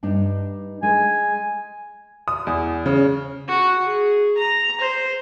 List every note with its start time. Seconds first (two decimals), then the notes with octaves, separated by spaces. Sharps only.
0.03 G2 D4 D#4
0.83 G#3 G#5
2.28 D#6
2.47 E2
2.86 C#3
3.48 F#4
3.85 G#4
4.37 A#5
4.80 C5